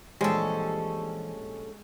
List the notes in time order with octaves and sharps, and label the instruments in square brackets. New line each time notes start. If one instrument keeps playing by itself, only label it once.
[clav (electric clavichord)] A#1 G3 [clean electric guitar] E3 G4 C5 [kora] G#3 [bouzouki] C#4 A4